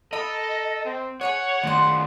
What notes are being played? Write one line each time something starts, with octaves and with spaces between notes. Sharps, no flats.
A4 A#4 D#5 B5
C4
G#4 B4 C#5 F#5 G#5
D#3 A3 F4 C6